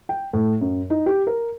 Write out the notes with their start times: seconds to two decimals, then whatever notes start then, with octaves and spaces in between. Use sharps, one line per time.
0.09 G5
0.33 A2
0.61 F#2
0.90 D#4
1.06 G4
1.27 A#4